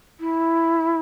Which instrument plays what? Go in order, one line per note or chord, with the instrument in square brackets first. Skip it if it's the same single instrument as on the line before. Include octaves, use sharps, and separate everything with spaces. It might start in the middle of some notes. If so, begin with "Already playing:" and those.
[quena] E4